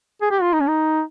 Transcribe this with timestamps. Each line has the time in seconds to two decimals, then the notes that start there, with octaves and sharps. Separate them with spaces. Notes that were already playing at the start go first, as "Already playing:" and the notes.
0.22 G#4
0.31 G4
0.41 F4
0.53 D#4
0.60 C#4
0.68 D#4